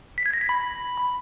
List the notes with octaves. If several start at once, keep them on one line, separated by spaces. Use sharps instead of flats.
B6
G#6
A#6
B6
B5